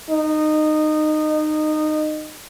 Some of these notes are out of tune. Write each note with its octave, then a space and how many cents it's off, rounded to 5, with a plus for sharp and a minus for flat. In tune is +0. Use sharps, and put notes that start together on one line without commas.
D#4 -20